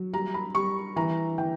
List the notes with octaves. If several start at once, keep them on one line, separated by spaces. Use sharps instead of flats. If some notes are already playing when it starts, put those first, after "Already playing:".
Already playing: F#3
G3 A#5
B5
G3 C#6
E3 A#5
E3 G5